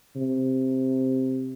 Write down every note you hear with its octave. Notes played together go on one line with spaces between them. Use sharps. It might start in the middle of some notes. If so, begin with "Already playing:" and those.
C3